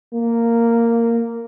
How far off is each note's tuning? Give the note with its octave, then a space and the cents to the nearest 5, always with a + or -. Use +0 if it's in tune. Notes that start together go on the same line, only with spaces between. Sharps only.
A#3 -10